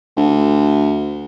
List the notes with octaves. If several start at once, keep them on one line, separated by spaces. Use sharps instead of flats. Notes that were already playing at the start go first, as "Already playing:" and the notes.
D2